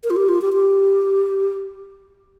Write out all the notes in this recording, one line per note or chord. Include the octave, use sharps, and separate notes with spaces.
A#4
F4
G4
F4
G4
G4